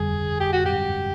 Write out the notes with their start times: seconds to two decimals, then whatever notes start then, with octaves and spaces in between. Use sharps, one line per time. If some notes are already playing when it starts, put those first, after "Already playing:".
Already playing: G1 F2 D3 G3 G#4
0.40 G4
0.53 F#4
0.66 G4